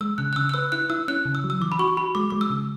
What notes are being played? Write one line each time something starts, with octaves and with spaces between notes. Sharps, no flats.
G#3 E6
C#3 F#6
F#6
C#3 E6
F#6
B4 E6
E4 F#6
E4 E6
C#4 F#6
C#3
E6
F#3
E6
E3 D6
B5
F#4 C#6
F#4 B5
G#3 D6
G#3 D6
E6
C#3